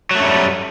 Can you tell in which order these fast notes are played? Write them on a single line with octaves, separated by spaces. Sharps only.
F#3 A3 F#2 G3